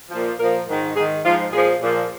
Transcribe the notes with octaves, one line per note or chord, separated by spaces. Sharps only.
A#2 F3
A#2 F3 A#4
G#2 D#3
G#2 D#3 G#4
G#2 F3 F4
A#2 F3 G#4
A#2 F3